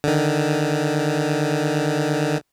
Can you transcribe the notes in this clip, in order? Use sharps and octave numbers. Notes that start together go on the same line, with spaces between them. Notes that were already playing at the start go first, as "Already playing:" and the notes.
D3 D#3